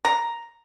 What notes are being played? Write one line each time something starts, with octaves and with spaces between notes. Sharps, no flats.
A#5